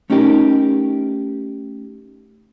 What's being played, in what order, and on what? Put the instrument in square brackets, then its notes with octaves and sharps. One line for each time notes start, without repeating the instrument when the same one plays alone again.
[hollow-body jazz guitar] A3 C#4 D#4 G4 A#4